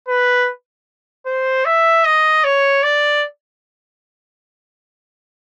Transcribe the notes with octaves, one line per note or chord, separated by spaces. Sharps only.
B4
C5
E5
D#5
C#5
D5